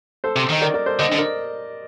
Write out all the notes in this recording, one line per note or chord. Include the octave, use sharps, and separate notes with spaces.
A4 C5
C3
D#3 D#5
A#4 D5
A#4 D5
A4 C5
D3 C5 D#5
D3
A#4 D5